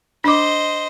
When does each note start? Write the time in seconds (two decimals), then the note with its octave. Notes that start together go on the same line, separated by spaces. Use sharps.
0.24 D4 C5 D#5 D6